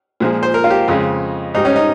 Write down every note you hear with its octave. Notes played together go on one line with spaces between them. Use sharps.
A#2 F3 G#3
C5
A#4
F4
G4
F2 C#3 G#3
G#2 G3 D#4
C#4
D#4